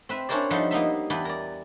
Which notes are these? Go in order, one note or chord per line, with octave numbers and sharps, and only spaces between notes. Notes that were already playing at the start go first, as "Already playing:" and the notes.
C4 B4 E5
C#4 D4 E4 A#4 C5 D5
F3 G3 D#4 A4 F#5 C6
A#3 B3 D#4 E5
E2 E4 B4 D5 G5
A#4 D5